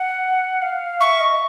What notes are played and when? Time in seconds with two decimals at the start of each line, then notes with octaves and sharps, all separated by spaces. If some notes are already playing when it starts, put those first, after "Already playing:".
Already playing: F#5
0.62 F5
1.00 E5 C#6
1.20 D#5